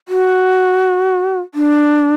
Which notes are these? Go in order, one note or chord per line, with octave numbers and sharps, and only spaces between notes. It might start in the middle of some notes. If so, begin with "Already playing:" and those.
F#4
D4